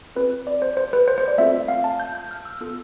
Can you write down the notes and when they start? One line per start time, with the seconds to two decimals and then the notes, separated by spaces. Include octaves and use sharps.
0.16 C4 F4 A4 B4
0.47 D5
0.62 C5
0.77 C5
0.93 B4
1.08 C5
1.18 C5
1.28 D5
1.38 A3 C4 F4 A4 E5
1.68 F5
1.84 A5
2.00 G6
2.15 G6
2.31 F6
2.45 E6
2.60 B3 F4 A4 E6